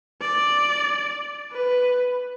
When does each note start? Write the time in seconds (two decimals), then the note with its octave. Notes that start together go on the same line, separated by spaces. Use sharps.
0.21 D5
1.52 B4